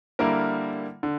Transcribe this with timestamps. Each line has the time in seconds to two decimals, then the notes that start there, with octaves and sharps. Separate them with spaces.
0.19 D3 G3 A#3 E4 A#4
1.03 D3